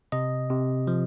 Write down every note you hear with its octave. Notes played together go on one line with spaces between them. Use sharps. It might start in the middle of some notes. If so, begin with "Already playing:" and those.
C3 D#5
C3
F3